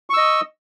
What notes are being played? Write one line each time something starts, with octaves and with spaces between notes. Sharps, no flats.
D#5 C#6 E6